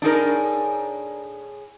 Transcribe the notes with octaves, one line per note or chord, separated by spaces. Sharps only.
A2 D4 D#4 G#4 A#4